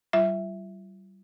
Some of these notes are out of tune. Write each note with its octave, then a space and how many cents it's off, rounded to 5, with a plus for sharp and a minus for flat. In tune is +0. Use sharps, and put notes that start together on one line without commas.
G3 -35 F4 -35 E5 +0